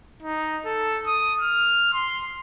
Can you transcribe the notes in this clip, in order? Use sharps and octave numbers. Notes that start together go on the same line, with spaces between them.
D#4
A4
D#6
F6
C6